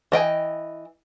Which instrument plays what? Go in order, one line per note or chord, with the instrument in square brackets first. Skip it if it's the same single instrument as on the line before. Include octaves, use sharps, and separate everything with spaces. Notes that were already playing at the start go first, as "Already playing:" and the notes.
[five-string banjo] E3 D#5 G5 G#5